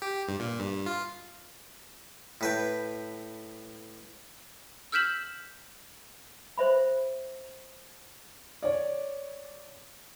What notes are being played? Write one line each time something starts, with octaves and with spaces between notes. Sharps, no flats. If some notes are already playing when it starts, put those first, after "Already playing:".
G4
G2
A#2
G2
F4
A2 B4 G5
E6 F6 G6 B6 E7 F#7
C5 E5 B5
C#5 D5